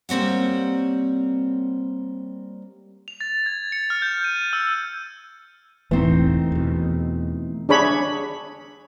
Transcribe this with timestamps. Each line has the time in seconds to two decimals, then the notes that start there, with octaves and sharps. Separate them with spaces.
0.09 G3 A#3 C4 C#5 F#5
3.08 F7
3.21 A6
3.46 G#6
3.72 C#7
3.90 F6
4.02 G6
4.24 D#7
4.53 E6
5.91 E1 A1 E3 A3 C4 D#4
6.52 E2 B2
7.69 D4 G#4 C#5 B5